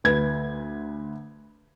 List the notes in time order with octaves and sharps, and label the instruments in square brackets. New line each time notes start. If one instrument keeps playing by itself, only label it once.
[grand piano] D2 B4 G#6